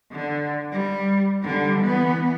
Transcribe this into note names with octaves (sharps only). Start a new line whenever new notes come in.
D3
G3
D3 G3
E3 B3